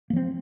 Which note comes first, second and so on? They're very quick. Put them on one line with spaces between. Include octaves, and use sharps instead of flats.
A#3 F3 C4